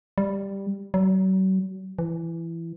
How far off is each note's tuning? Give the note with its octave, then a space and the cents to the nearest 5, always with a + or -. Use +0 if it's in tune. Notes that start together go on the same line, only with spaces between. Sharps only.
G3 +5
F#3 +40
E3 +15